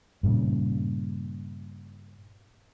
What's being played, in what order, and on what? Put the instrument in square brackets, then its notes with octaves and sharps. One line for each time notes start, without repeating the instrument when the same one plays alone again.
[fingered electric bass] G2 A#2 C#3